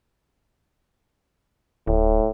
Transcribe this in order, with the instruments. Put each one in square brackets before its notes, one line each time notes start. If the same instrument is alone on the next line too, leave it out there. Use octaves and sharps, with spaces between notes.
[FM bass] D1 [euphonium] A2